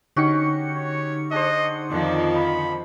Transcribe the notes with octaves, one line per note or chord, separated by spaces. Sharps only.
D3 C#4 D#4 F#4 G4 C#7
C#5
D4 G#4 C5 D#5
F2 D#3 F3 D5
B5